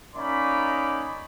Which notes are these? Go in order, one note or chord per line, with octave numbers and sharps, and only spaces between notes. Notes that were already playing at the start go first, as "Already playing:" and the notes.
A#3 C#4 D#4 D5 B5